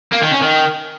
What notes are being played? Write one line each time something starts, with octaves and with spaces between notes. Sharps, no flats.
A#3
D#3
C#4
D#3